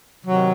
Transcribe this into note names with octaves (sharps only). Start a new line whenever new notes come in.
C3 D#3 F#3